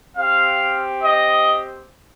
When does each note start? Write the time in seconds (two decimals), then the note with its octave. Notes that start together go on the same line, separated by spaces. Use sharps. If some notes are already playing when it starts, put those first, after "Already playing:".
0.17 C4 G4 F5
1.01 D#5